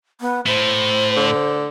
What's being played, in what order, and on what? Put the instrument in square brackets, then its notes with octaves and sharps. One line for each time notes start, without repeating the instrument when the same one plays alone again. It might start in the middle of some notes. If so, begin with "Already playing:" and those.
[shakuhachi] B3
[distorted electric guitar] A2 [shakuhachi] C5
[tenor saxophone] D3